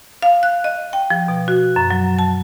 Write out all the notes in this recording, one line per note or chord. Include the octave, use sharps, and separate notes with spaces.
F5
F#6
D#5
G5
F3
B2
F#4
F#2
F#3
A5